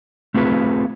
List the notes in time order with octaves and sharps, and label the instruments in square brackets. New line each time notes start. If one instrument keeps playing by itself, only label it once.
[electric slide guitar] A3 C4 F4 G#4 B4